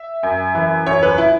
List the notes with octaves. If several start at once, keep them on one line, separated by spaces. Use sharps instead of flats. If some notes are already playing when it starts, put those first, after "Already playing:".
Already playing: E5
F#2
E3
F#2 C#5
B4
E4